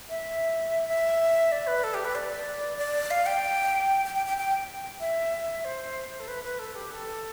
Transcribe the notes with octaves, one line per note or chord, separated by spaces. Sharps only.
E5
E5
D5
B4
A4
G4
B4
D5
D5
F5
G5
G5
G5
G5
G5
E5
C5
A4
B4
B4
A4
G4
A4